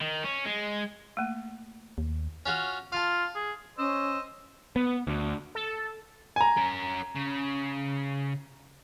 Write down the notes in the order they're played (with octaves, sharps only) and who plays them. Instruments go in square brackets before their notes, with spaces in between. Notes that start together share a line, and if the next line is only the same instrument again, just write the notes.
[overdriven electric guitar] D#3
C#4
G#3
[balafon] A3 A#3
[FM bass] D#2
[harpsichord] C#4 F4 F#4
[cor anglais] F4 [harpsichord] F5 A5
[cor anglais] G#4
[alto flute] C#4 [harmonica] C5 D#5 [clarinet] E6
[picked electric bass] B3
D2
[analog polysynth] A4
[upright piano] G#5 A#5
[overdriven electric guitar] C#4 A#4
C#3